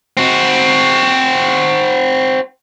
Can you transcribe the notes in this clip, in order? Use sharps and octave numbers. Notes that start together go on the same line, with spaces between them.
C4 F#4